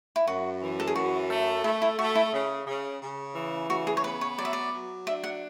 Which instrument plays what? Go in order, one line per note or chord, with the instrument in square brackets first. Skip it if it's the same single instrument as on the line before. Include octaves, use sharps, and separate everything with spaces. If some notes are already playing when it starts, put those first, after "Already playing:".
[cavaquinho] E4
[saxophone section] F#2 [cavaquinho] F#4
[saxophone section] E3
[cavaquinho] A4
G#4
[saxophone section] F#2 [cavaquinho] F#4
[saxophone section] A3
[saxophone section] A3 [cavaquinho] E4
[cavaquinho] E4
[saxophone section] A3 [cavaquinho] F#4
[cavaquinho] E4
[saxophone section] C#3
C#3
C#3
E3
[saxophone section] C#3 [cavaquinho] F#4
[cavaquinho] G#4
C#5
[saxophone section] B3 [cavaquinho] B4
[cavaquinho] C#5
[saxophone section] F#3 [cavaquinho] D5
[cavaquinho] E5
D5
[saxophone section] F#3
[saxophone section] D4 [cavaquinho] E5
[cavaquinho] F#5